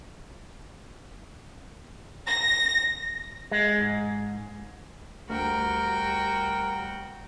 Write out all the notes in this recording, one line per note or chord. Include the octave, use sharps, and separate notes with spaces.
A#6
G#3
G#2
D2 G3 F#4 A#4 G5